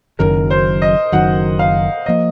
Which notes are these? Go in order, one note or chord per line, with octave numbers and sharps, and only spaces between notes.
F#1 F#2 D#3 F#3 A#4
C5
D#5
F#1 F#2 D#3 F#3 F#5
F5
F3 A#3 D#5